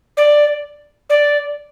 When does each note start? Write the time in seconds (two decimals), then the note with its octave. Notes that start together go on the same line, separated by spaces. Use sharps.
0.17 D5
1.10 D5